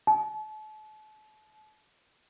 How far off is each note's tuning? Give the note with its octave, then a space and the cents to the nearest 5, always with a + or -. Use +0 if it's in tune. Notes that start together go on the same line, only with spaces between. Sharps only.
A5 -35